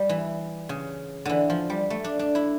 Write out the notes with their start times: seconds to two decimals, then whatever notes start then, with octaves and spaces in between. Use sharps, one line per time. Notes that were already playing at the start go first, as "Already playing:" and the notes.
Already playing: G3
0.09 E3
0.69 C#3
1.25 D3 E3
1.50 F3
1.70 G3
1.90 A3
2.04 D4
2.19 D4
2.35 E4